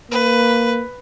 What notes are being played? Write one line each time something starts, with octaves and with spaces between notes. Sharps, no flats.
A#3 B4